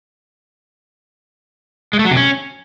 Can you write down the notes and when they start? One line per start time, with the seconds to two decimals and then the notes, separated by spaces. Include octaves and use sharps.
1.93 G#3
1.99 A3
2.05 F#3
2.11 C3
2.17 C#4